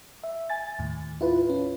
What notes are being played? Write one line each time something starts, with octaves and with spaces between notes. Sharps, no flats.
E5
G#5 A6
D#2 A2
E4 F4 B4
C#4